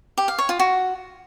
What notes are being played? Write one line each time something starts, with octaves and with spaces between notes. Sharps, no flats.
G4
F5
C#5
F4
F#4